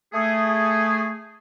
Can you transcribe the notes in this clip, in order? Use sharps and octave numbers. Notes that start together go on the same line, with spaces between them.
A3 G#4